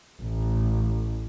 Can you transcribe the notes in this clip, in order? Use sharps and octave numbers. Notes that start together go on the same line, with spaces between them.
A1